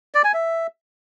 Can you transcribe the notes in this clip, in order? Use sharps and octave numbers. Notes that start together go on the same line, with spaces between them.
D5
G#5
E5